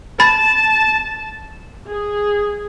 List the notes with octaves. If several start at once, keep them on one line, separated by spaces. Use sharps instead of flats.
A5 B5 A6
G#4